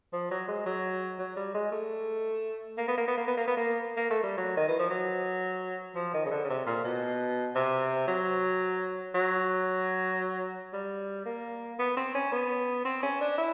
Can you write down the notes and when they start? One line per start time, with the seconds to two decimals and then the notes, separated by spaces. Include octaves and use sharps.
0.13 F3
0.31 F#3
0.48 G#3
0.66 F#3
1.19 F#3
1.36 G3
1.55 G#3
1.72 A3
2.78 A#3
2.88 B3
2.98 A#3
3.08 B3
3.17 A#3
3.27 B3
3.37 A#3
3.47 B3
3.57 A#3
3.97 A#3
4.10 A3
4.23 G3
4.37 F#3
4.57 D#3
4.68 E3
4.79 F3
4.90 F#3
5.96 F3
6.14 D#3
6.25 C#3
6.31 D3
6.44 C#3
6.50 C3
6.66 A#2
6.84 B2
7.55 C3
8.08 F#3
9.15 F#3
10.73 G3
11.26 A#3
11.79 B3
11.97 C4
12.15 C#4
12.32 B3
12.85 C4
13.03 C#4
13.21 D4
13.38 E4